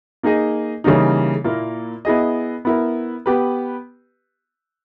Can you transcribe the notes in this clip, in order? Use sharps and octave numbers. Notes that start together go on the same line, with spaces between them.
A#3 D#4 G#4 D#5
C#3 E3 G3 A#3 D#4
A#2 A#3 E4 A#4
B3 E4 G#4 D#5
B3 E4 A#4
B3 G4 B4